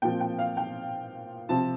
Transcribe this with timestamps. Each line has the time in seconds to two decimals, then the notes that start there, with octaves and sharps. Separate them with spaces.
0.02 A#2 F3 C4 G5
0.20 G5
0.39 F5
0.57 G5
1.49 C3 F3 C4 A5